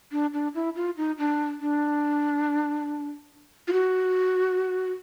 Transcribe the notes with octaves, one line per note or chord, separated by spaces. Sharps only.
D4
D4
E4
F4
D#4
D4
D4
F4
F#4